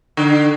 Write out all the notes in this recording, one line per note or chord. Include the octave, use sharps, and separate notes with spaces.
D3